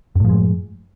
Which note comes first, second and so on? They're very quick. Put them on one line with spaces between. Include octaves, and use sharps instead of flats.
F#2 A2 F3 G#3